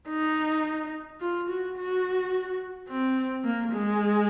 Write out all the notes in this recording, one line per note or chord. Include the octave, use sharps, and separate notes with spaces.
D#4
F4
F#4
F#4
C4
A#3
G#3